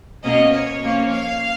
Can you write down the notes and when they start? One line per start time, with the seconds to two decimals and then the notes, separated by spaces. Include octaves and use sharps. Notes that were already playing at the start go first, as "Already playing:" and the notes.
0.23 B2 A#3 C#4 D#5
0.52 C#5
0.81 F3 A#3 C#4
1.10 F5